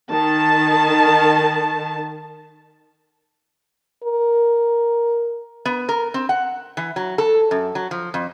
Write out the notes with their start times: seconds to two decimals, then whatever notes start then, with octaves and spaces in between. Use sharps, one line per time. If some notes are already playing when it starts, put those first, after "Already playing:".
0.11 D#3 A5
4.04 A#4
5.66 B3
5.89 A#4
6.14 C4
6.29 F#5
6.77 E3
6.96 F#3
7.18 A4
7.51 F#2
7.75 F#3
7.91 F3
8.14 F2